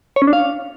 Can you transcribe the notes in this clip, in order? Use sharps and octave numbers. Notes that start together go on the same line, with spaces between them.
C#5
C#4
D4
F5